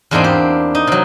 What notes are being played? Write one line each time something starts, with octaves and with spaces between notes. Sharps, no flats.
E2 G#2 G#3 A#3 C4 D4
G4
D#4
C3 F#3